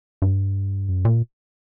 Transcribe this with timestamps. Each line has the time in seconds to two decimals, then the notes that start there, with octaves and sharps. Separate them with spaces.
0.22 G2
0.89 F#2
1.05 A#2